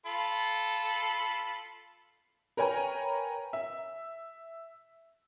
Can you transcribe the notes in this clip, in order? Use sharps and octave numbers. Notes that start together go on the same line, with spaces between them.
F4 A4 B5
A#4 B4 C#5 G5 G#5 A#5
E5